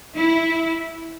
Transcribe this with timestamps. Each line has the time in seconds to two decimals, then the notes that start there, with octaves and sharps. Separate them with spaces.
0.16 E4